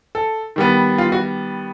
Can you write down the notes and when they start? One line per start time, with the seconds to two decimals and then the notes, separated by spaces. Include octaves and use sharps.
0.15 A4
0.56 D#3 G3 B3
0.98 F4
1.12 F#4